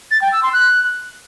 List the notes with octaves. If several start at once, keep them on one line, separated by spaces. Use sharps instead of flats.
A6
G5
E6
C6
F#6